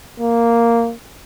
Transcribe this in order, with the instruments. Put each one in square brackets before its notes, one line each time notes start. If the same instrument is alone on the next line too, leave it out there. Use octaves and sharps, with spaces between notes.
[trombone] A#3